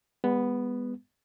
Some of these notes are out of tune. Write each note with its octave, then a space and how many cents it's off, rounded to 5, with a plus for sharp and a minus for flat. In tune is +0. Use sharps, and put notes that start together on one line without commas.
G#3 -40 B3 +0